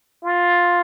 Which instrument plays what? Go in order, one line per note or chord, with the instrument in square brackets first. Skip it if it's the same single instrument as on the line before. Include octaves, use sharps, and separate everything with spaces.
[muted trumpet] F4